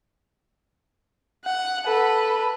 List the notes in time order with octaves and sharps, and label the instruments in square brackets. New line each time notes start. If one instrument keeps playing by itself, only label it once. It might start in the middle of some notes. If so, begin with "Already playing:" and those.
[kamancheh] F#5
A4 B4